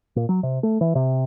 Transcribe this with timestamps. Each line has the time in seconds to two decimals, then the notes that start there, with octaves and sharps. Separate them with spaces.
0.16 A#2
0.29 F#3
0.43 C3
0.63 A3
0.81 E3
0.95 C3